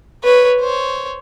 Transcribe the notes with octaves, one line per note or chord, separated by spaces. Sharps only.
B4 C#5
C5 C#5